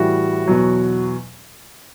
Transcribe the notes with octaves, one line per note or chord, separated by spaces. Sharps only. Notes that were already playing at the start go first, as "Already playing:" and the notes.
Already playing: A2 E3 G3 F#4
E2 B2 F#3